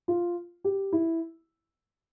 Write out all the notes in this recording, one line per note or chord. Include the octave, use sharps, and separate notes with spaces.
F4
G4
E4